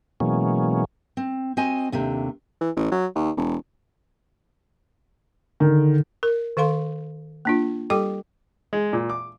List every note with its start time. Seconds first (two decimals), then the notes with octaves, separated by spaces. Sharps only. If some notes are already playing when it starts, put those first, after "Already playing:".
0.20 B2 E3 F#3 G#3 A#3 C#4
1.17 C4
1.57 C4 F#4 D#5 G#5
1.92 D#2 C3 A3 D4
2.61 E3
2.76 A1
2.92 F#3
3.15 D#2
3.37 E1
5.60 D3 D#3
6.23 A#4
6.57 D#3 A4 F5 C6
7.45 A#3 D4 F4
7.90 G3 G4 A4 G5 D6
8.73 G#3
8.93 A#2
9.10 D6